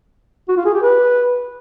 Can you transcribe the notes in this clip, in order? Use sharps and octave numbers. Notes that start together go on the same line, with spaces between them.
F#4
F4
G#4
G4
B4